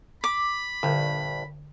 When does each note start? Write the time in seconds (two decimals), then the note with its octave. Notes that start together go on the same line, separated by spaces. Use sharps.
0.24 B5 D6
0.83 A#1 G2 D3